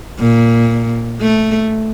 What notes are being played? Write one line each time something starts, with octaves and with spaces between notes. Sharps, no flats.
A#2
A3